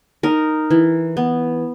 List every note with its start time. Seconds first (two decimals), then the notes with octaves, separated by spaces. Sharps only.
0.23 D#4 A#4
0.70 E3
1.17 B3